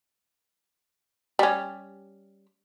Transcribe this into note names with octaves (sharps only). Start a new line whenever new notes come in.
G3 C#4